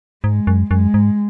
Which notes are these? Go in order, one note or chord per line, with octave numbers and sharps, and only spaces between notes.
G#2 G#3
F#2
F#2 G#3
G#2